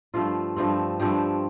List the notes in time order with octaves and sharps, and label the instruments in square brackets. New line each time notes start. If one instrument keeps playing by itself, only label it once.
[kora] G2 F3 A3 C4 F4
G2 F3 A3 C4
G2 F3 A3 C4 G4